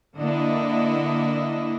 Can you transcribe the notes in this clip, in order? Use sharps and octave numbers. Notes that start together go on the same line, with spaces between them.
D3 A#3 D4 E4 D#5